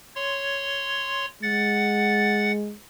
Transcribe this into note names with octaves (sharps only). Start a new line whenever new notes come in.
C#5 C6
G#3 F#5 A6